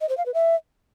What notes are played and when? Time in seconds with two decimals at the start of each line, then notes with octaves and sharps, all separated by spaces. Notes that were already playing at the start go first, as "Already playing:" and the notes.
0.01 D#5
0.09 C5
0.18 F5
0.26 B4
0.34 E5